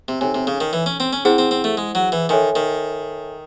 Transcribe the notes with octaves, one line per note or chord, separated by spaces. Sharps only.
C3
C3 D#4 A4 C#5 G#5
C3
C#3
D#3
E3
C#4
C4
C#4
C4 E4 G#4 C5 F#5
C4
C4
A3
G#3
F#3
E3
D#3 A4 C#5 E5 G#5 C6
D#3